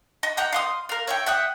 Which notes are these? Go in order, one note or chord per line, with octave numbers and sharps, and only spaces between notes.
D#5
D#5 F#5 G5 A#5
F5 C6 D#6
A#4 F5
C#5 E5 G5
E5 F#5 G5 D#6